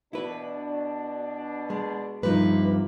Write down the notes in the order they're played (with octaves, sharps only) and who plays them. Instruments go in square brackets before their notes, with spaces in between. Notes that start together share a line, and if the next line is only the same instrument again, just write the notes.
[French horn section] B2 D4 [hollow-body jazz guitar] E4 B4
[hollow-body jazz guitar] G#3
[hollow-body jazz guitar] G2 F3 D#4 [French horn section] C3 A#3 [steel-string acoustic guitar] B4